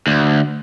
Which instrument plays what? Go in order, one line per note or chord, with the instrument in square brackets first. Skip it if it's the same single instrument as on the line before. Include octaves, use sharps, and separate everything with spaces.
[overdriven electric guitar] D2